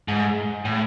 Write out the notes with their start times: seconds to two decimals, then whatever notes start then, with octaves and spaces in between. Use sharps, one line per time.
0.08 G#2
0.65 A2